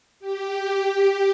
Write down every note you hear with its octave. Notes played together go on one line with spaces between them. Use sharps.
G4